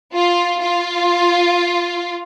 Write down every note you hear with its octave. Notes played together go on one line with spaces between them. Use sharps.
F4
F4